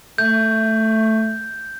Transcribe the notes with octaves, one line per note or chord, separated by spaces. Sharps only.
A3 G6